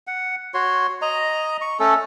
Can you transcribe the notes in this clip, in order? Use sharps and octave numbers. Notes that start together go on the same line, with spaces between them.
F#5
F#4 C#5 C6
D#5 A#5
C#6
A3 C#4 A4